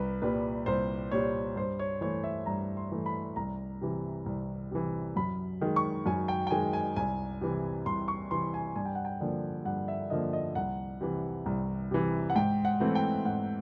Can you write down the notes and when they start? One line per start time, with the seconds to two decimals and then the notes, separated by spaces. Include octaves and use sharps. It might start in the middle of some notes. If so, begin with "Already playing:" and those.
Already playing: C2 B4
0.22 A#2 G3 B4
0.66 C2 C5
1.11 A#2 G3 C#5
1.56 G2 C5
1.79 C#5
2.01 E3 A3 C#5
2.24 E5
2.46 G2 A#5
2.77 C6
2.92 E3 A3
3.06 B5
3.36 C2 A#5
3.81 C3 E3
4.26 C2
4.71 C3 E3
5.16 F#2 B5
5.61 D#3 G#3
5.76 C#6
6.06 F#2 G#5
6.28 G5
6.47 G5
6.50 D#3 G#3 G#5
6.73 G#5
6.96 C2 G#5
7.41 C3 E3
7.86 C2 C6
8.08 C#6
8.31 C3 E3 C6
8.54 G#5
8.76 G2 G#5
8.85 G5
8.95 F#5
9.05 G5
9.20 D3 F3 A#3
9.65 G2 F#5
9.88 E5
10.10 D3 F3 A#3 D#5
10.33 D#5
10.55 C2 F#5
11.01 C3 E3
11.46 C2
11.91 C3 E3
12.30 F#5
12.35 G#2 G5
12.65 F#5
12.80 E3 A3 C4
12.95 G5
13.25 G#2 F#5